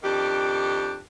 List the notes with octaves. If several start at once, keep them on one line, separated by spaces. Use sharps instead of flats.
F2 D#3 D4 G4